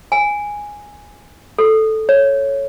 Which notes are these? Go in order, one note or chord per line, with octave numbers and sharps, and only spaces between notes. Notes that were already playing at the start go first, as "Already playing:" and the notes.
G#5
A4
C#5